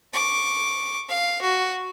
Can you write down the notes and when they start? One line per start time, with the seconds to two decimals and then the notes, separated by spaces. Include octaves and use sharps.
0.13 C#6 D6
1.09 F5
1.42 F#4